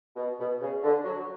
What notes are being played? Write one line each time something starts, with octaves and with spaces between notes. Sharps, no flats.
B2
B2
C#3
D3
F#3